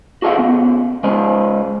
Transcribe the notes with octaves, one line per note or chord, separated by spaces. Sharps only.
F#4 G#4 A4 D#5 F5 F#5
C#3 B3
C#3 G#3 C5 D#5